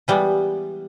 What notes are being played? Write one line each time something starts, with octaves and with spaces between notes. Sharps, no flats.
E3 G3 G#3 B3